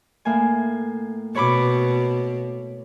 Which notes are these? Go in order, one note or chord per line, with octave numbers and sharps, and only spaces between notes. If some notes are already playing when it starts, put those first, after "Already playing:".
A2 A#3 G#5
B2 C#5 B5 D6